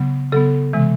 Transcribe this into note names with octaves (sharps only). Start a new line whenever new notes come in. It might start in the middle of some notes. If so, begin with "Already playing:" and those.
Already playing: C#3 F#3 B3
C#3 F#3 B3 A4
C3 E3 G#3